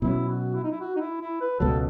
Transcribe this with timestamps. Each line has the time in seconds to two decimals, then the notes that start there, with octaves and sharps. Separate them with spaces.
0.02 B2 F#3 C#4 E4
0.29 F#4
0.55 E4
0.64 D#4
0.71 E4
0.81 F#4
0.96 D#4
1.01 E4
1.21 E4
1.41 B4
1.60 C#2 B2 F#3 A4